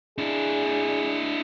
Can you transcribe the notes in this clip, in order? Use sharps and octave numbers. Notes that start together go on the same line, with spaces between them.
D4 E4 G#4